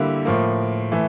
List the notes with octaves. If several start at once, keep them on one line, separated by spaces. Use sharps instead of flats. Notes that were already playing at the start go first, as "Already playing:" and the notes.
Already playing: D3 G3 A#3 E4
A2 F3 A#3
E3 A3